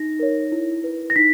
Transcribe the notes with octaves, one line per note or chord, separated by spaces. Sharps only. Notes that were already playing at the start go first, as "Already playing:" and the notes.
Already playing: D#4 A#6
A#4 C#5
E4
B4
A#6
D#4 B6